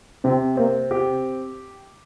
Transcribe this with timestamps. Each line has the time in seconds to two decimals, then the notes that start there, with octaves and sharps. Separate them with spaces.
0.24 C3 C4
0.57 A#3 C4
0.91 G4